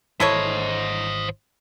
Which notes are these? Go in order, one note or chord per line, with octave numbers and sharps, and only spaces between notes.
G#1 E3 E4 A4 C5 C#5 D#5